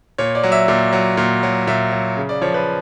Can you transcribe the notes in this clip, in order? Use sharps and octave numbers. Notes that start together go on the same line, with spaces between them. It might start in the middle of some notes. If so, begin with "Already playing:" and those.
A#2 C#5
D5
F#3
E5
A#2
F#3
A#2
F#3
A#2 E5
F#3
C#3
D5
F3 C#5
B4